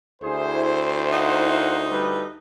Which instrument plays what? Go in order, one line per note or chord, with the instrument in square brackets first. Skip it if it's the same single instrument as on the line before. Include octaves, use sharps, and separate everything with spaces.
[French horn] D2 [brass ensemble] E4 C5 [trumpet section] G#4
[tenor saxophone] D#4 [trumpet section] A#4 F5 F#5
[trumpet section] G3 A4 B4